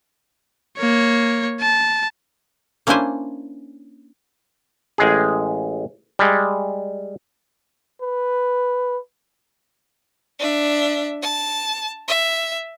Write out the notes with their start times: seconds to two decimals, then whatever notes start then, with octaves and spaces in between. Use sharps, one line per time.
0.78 A#3 C#5
1.61 A5
2.87 A#3 C#4 D4 E4 C5 G#5
4.98 A1 G#3 G#4
6.19 G3 G#3
8.02 B4
10.39 D4 E5
11.22 A5
12.08 E5